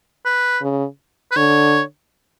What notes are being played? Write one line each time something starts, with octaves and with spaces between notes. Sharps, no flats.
B4
C#3
B4
D3 C#5